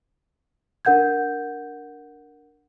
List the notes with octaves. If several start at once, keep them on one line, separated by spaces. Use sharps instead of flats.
D4 A#4 F#5 G6 G#6